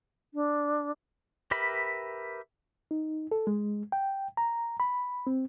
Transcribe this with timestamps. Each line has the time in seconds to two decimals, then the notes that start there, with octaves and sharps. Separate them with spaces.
0.34 D4
1.51 G4 A#4 B4 E5 B5
2.91 D#4
3.32 A4
3.47 G#3
3.92 G5
4.37 A#5
4.80 B5
5.27 C4